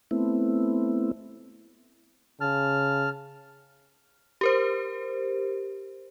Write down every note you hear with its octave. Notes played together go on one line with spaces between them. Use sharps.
A3 B3 C4 E4
C#3 A5 F6
G4 A#4 C5